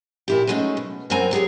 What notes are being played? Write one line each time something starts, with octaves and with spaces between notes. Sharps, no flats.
A#2 E4 G4
F#3 G#3 A3 C#4 D#4
B2
F#2 E3 F#3 C4 G#5 A#5
F#3 G4 G#4 C#5